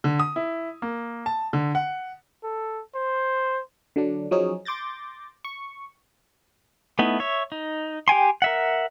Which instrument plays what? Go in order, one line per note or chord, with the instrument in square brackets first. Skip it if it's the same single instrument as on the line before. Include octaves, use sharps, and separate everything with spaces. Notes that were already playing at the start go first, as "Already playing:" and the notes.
[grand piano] D3
D#6
E4
A#3
A5
D3
F#5
[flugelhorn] A4
C5
[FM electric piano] D3 F#3 D4
F3 F#3 C#4 D#4 G#4
C6 D6 G6 A6 A#6
C#6
[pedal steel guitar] A3 B3 D#4 E4
C#5 E5
D#4
G4 G5 G#5 C6
A#4 E5 F#5